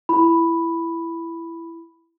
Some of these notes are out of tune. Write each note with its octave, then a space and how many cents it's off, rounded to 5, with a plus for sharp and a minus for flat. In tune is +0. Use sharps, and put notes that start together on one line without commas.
E4 +15 B5 +0